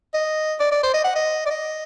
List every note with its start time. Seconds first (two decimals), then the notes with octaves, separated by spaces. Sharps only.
0.14 D#5
0.60 D5
0.72 D5
0.83 C5
0.94 D#5
1.04 F#5
1.16 D#5
1.46 D5
1.50 D#5